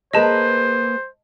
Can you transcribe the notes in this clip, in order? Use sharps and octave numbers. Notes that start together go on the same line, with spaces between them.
A#3 G#4 B4 C5 D#5 A5